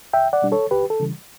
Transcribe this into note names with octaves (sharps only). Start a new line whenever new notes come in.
C#2 E5 G5
D5 F#5
B2 G3 D4
A4 C#5
C#2 G4 B4
A4
C#3 E3 G3